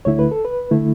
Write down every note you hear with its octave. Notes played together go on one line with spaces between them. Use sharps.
D2 D3 A3 E4 C#5
B4
A4
B4
D3 A3 E4